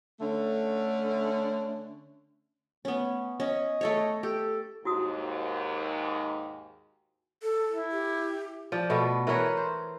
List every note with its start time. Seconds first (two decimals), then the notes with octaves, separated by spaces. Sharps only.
0.20 D3 A3 C#4
2.85 A3 B3 C#4
3.40 C#4 D#5
3.81 A3 A4 C#5
4.23 G4 A4
4.85 D#2 G#2 E4 F#4 D#6
7.42 A4
7.69 E4
7.91 G4
8.72 F3 D5
8.90 B2 A3 B3
9.27 E3 A#4 B4 C#5
9.57 C5